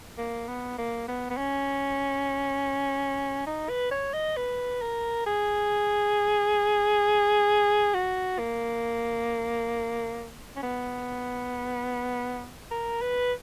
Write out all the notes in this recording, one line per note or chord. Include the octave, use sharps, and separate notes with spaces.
A#3
B3
A#3
B3
B3
C#4
D#4
B4
C#5
D#5
B4
A#4
G#4
F#4
A#3
C#4
B3
A#4
B4